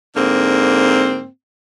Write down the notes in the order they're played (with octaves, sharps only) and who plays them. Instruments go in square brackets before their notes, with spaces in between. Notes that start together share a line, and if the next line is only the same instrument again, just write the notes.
[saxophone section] G#2 D3 A#3 C4